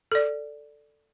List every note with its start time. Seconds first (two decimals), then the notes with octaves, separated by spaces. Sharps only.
0.12 A4 D5